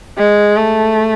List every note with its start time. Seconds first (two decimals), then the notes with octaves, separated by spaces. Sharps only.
0.18 G#3
0.57 A3